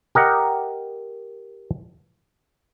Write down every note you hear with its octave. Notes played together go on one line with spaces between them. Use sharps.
G4 A#4 D#5 F#5